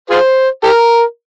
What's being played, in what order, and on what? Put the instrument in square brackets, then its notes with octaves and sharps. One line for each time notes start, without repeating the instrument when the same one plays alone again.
[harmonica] F4 G#4 C5
G4 A#4